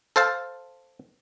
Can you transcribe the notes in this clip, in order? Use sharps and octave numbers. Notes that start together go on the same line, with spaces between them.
A4 C5 F5 A5